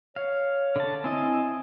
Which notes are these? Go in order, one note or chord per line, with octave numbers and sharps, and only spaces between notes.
C#5 F5
D3 A5
C4 E4 D#5 G#5